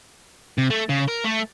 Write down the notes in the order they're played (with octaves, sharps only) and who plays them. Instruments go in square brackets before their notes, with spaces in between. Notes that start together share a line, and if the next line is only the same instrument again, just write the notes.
[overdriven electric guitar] C3
A3
C#3
A#4
A3